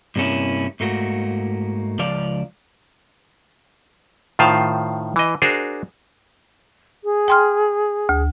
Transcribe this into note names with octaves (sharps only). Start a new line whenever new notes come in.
G2 C3 A#3 C#4 E4
G#2 A3 A#3 F#4
C#2 F3 D5 F5
A2 D#3 F4 C5 F5
E3 D#5
D4 F#4 G#4 A#4 C5
G#4
G5 C6 F6
D2